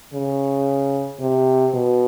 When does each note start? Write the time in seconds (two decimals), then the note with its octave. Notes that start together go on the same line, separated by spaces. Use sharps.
0.14 C#3
1.20 C3
1.74 B2